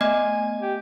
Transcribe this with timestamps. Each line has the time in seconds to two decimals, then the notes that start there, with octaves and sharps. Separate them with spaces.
0.01 A3 B3 D#5 G#5
0.62 G4